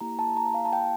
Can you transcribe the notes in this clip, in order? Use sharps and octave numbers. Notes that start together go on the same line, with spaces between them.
A#3 E4 G4 A#5
A5
A#5
F5
A5
G5